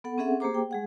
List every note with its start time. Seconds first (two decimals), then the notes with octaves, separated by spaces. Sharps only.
0.04 B3 A4 F#5
0.18 C4 C#4 G#4 A4 E5 F#5
0.40 A#3 G4 G#4 C5 A#5 D6
0.54 G5
0.71 G#3 G#4 F#5